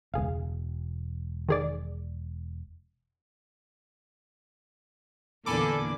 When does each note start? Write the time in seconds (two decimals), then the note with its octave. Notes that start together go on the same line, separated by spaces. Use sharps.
0.14 E1 C#2 G#4 F5
1.49 D#3 G#4 D5
5.46 E2 A#2 D3 A#3 A4 G#5 B5 D6